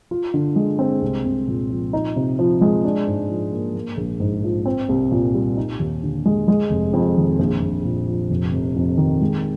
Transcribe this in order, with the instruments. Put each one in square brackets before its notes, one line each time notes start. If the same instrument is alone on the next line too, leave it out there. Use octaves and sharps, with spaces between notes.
[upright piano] F4
D3
G#3
C4
C2
C2
A#2
F3
D#4
C3
F3
G#3
D4
G#2
F3
A#3
A#3
A#1
G#2
F3
C4
C2
A#2
G3
D#4
D#2
D3
G#3
G#3
F1
F2
D#3
A#1
A#1
A#2
F3
F1
F1
F2
D#3
G#3